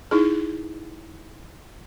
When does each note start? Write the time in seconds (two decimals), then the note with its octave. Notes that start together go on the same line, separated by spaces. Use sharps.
0.11 D#4 E4 G#4